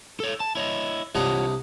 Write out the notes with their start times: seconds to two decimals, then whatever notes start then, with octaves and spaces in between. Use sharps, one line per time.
0.20 A4 C#5
0.40 A5
0.55 E4 C#5 D#5
1.15 C2 D4 F4 C#5 D#5 F#5